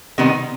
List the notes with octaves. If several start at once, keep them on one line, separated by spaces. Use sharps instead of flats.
C3 D#3 G3 B3 D#4